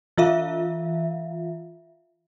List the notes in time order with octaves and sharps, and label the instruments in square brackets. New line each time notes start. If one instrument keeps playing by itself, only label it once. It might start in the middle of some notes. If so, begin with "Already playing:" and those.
[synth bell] E3 F4 E5 F5